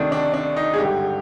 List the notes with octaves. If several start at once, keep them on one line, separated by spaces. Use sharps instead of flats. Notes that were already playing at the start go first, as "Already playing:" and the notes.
Already playing: D2 C3 D#3 D4
D4
D4
D#4
G#4
G#1 G2 D3 G4